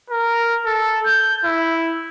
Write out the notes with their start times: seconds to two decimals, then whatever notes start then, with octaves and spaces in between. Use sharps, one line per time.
0.10 A#4
0.66 A4
1.06 G6
1.45 E4